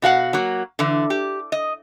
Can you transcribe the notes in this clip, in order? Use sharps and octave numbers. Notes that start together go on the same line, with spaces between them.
B2 F#4 F5 F#5
F#3 A#3 F#4
D3 E3
G4
D#5